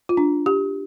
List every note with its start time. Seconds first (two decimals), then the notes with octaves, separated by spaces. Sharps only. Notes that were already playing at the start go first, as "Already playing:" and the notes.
0.09 F4
0.17 D4
0.46 G4